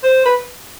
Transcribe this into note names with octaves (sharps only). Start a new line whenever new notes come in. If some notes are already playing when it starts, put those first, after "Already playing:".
C5
B4